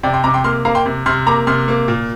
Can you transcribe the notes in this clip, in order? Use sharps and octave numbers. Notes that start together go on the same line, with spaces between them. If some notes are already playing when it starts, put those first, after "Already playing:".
C3 D5 G5
G5 C6
C3 A#5 D6
G5 C6
A#3 C6 F6
A#3 F5 A#5
G5 C6
C3
C3 C6 F6
A#3 A#5 D6
C3 C6 F6
A#3
A#2